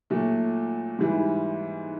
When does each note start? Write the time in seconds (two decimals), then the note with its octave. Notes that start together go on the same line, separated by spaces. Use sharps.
0.10 A#2 F#3 A3
0.99 G#2 E3 G3